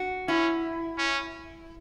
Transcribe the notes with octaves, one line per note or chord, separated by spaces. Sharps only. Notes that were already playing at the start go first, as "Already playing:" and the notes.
Already playing: F#4
C#4 E4
C#4